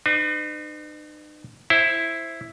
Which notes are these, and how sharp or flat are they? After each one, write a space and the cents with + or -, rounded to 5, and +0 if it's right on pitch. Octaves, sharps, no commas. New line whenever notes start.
D#4 -45 B4 +35
E4 +0 C5 +10